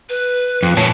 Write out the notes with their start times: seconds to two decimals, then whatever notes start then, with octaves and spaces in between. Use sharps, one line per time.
0.09 B4
0.63 F2
0.77 A#2 C#5 A5